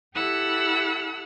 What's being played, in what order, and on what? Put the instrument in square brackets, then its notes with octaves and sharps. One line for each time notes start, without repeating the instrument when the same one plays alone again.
[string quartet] E4 G4 A4 F#5 E6 F#6